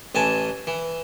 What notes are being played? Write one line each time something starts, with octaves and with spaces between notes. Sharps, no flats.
A1 E3 G#5 A5
E3